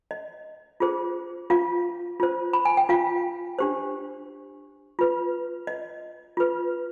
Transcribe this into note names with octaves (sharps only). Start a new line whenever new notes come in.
D#5
F4 G#4 C5
F4 F5
F4 C5
B5
G#5
G5
F4 F5
D4 G4 C5
F4 B4
D#5
F4 B4